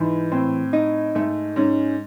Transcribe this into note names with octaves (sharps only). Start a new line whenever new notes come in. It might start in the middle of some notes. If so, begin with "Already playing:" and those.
Already playing: G#2 E3
A2 C4
D#4
G#2 A3
G#2 C#4